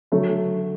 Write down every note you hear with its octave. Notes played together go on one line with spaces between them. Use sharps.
D3 F#3 A3